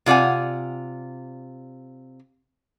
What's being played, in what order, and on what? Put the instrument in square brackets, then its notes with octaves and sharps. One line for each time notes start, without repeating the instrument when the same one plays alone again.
[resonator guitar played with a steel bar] C3 F4 D5 F#5 G#5